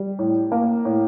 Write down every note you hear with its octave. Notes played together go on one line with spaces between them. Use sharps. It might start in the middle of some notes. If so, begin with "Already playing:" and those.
Already playing: G3
A2
A#3
A2